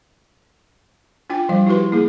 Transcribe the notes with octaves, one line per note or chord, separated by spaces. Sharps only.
D4 F4 G5 D6
F3 G3 F5
E4 F#4 G4 B4 C6
A#3 E4 G#4